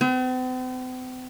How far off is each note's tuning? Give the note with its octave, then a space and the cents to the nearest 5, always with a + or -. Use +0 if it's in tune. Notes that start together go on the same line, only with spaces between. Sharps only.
C4 -45